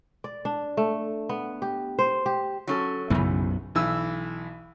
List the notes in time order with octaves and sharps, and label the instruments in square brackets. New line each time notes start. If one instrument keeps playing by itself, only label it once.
[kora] D5
D4
A3
B3
G4
C5
G4
[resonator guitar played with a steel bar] F#3 C#4 A4
[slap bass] B1 F#2 B3 [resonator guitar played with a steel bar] C#3 E3
[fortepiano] B1 E3 E6